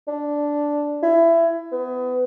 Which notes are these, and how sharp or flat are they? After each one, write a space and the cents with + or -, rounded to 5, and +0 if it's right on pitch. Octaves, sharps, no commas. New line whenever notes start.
D4 -5
E4 +20
B3 +30